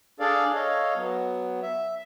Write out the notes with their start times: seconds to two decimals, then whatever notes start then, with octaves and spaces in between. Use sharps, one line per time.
0.20 D4 G#4 A4 D5 F5
0.54 A4 C#5 D#5 F5
0.96 F#3 B3
1.62 E5